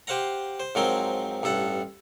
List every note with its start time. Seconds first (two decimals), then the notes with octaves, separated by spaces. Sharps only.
0.07 G4 C5 F5 F#5 A#5
0.60 C5
0.75 G#2 F3 F#3 C4 A#4 C6
1.43 A1 G2 A4 F#5